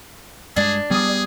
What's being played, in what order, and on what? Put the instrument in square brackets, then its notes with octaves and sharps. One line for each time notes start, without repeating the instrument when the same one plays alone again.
[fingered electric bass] G2 G#3 [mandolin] D4 [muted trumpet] G#4
[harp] G3 D#6 [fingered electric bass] B3 [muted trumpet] G#4